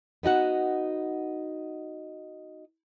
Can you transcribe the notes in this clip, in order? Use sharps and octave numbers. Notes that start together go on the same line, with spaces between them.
B3 D#4 F#4 F#5